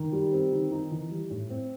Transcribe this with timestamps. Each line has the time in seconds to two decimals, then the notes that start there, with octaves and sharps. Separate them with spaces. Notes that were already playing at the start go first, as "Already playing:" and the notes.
Already playing: D#3
0.13 G3
0.32 C4
0.52 D#3
0.72 D#4
0.91 E3
1.11 G3
1.30 A2
1.50 C4